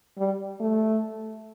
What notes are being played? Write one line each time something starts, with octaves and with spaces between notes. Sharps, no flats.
G3
A3